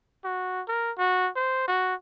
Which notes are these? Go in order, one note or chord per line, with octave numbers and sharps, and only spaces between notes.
F#4
A#4
F#4
C5
F#4